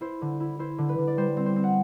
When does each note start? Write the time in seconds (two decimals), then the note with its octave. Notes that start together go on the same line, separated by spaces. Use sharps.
0.01 E4 C5
0.22 D3
0.40 E4
0.59 E4 C5
0.78 D3
0.89 B4
0.98 D3
1.07 D5
1.17 G3 C5
1.37 C4
1.46 C5
1.56 C4
1.64 F#5